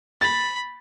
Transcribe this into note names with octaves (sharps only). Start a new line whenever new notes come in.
B5 A6